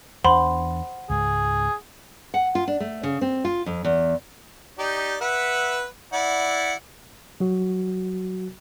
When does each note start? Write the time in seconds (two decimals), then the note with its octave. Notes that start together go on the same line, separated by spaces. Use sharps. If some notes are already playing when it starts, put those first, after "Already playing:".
0.24 E2 D4 C5 F#5 B5 C6
1.10 C#2 G#2 G#4
2.34 F#5
2.55 F4
2.68 D4
2.80 A3
3.03 C#3
3.21 C4
3.45 F4
3.66 F2
3.84 E2
4.79 D#4 G4 D5
5.21 B4 E5 F#5
6.13 E4 D5 F#5
7.40 F#3 F#4